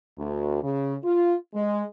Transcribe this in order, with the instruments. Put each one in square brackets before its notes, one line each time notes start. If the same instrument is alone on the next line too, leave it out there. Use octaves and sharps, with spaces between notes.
[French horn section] D2
C#3
F4
G#3